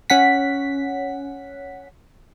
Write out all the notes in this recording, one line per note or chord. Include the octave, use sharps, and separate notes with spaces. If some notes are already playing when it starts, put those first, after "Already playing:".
C#4 F#5 B6